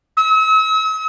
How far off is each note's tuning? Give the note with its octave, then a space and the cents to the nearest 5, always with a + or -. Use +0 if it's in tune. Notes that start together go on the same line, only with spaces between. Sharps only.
E6 -45